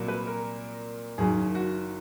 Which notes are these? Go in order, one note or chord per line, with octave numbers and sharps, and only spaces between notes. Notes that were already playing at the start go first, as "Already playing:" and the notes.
Already playing: C2 A#2 F#3 A#3
B4
A#4
F#1 F#2 D#3 G#4
F#4